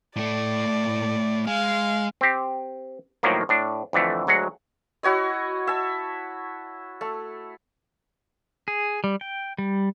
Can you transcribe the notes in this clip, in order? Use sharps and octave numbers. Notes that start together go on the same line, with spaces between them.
A2 A3 D5
G#3 F5
C4 G4
A2 D#3 F3 F#3 A#3
A2 D4
F2 D3 E3 A3
D2 F#3 G#3 F#5
E4 F#4 C#5 D#5
E5 A5
A3
G#4
G3
G5
G3